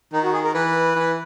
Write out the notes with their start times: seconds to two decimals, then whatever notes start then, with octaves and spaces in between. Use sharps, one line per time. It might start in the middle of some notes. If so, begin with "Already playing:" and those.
0.13 D#3 D#4
0.23 F#4
0.33 G#4
0.44 A#4
0.54 E3 B4
0.96 E3